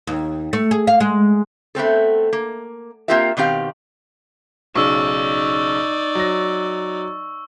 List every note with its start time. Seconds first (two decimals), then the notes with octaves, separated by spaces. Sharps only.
0.07 D#2
0.53 A3
0.71 G#4
0.87 F5
1.00 G#3
1.75 A3 B3 C4 A4
2.33 A#3
3.08 A#3 C4 F4 G4 A#4 E5
3.37 B2 D#3 C4 G4 F5
4.76 B1 C#3 D#4 D5 C#6 E6
6.15 F#3 A#6